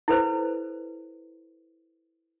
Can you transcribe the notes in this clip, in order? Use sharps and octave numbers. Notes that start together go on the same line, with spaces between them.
E4 A4 B4 C5